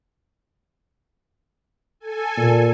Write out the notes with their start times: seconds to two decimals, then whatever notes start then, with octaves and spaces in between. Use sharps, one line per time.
2.00 A4 G#5
2.37 A#2